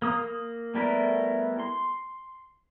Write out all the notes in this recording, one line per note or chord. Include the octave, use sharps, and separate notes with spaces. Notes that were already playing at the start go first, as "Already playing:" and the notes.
A#3 D#6
G3 A3 B3 E4 A#4
C6